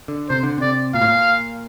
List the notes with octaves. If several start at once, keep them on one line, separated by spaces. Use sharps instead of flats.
D3
C3 C5
D3
C3 D5
A#2 F5
A2
A#2